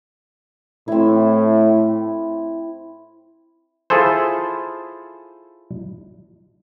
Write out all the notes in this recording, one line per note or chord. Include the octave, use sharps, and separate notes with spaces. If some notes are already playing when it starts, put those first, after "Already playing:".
A2 C4 E4
E4 F4 G#4 A4 C5